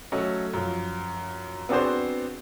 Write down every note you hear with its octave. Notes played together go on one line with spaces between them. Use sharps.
F#3 A3 C#4 D#5
F#2 F3
B3 C4 D4 F#4 G#4 C5